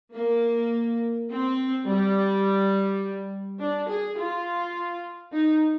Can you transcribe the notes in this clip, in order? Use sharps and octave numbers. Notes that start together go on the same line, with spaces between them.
A#3
C4
G3
D4
G#4
F4
D#4